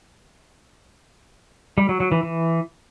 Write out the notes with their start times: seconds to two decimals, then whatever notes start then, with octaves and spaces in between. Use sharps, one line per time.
1.78 G3
1.89 F#3
2.00 F#3
2.12 E3
2.23 E3